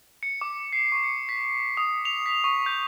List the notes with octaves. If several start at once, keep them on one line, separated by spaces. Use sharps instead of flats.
C#7
D6
C7
C#6
C#7
B6
D#6
F7
B6
C#6
G6